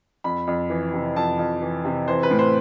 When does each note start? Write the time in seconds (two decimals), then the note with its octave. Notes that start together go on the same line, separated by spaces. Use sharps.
0.24 F2 B5
0.47 F2
0.70 E3
0.93 C3
1.16 F2 A5
1.39 F2
1.62 E3
1.85 C3
2.08 E3 C5
2.23 B4
2.31 A2
2.39 C5